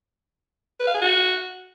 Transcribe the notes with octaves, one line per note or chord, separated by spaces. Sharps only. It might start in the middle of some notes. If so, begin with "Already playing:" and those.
B4
F5
G#4
F#4